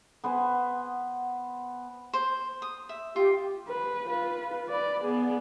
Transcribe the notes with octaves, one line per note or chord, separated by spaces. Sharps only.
B3 C5 F#5 G#5
C5
D#6
E5
F4 G4
B4
F4 B4
B4 D5
B3 G#4